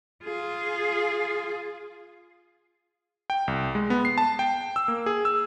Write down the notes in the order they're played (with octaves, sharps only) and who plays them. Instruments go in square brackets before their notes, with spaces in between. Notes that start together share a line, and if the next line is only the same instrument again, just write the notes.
[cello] F4 G#4
[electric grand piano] G5
C2
G#3
B3
C7
A5
G5
E6
A#3
G#4
E6